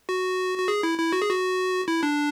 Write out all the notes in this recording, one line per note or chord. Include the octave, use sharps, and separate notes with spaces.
F#4
F#4
G#4
E4
E4
F#4
G#4
F#4
E4
D4